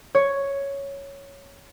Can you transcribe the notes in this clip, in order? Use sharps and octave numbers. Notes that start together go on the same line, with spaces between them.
C#5